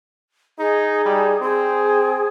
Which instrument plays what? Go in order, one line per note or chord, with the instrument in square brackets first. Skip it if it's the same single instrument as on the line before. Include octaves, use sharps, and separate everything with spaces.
[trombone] D#4 [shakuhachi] G#4
[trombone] G3
[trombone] C4 [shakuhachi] G#4